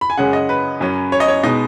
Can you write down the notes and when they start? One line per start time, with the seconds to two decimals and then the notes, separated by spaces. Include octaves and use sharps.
0.01 B5
0.10 G#5
0.18 F#2 C#3 G#3 C#4 F#5
0.33 D#5
0.49 B4
0.80 F#2 F#3 C#4
1.12 C#5
1.20 D#5
1.28 C#5
1.43 B2 G#3 B3 D#4 D#5